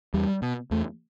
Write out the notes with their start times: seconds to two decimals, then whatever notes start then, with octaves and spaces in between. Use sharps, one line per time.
0.14 E2 G3
0.42 B2
0.71 E2 A3